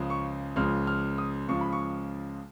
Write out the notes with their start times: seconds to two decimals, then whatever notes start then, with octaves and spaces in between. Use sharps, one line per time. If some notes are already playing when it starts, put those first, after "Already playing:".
Already playing: C#2 C#3 F3 G#3
0.10 C#6
0.56 C#2 C#3 F3 G#3 F6
0.87 F6
1.18 D#6
1.48 C#2 C#3 F3 G#3 C#6
1.61 B5
1.72 C#6